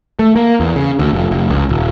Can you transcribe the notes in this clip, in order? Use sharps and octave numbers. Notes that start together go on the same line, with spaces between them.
A3
A#3
E2
C#3
D2
F1
F1
C#2
D#1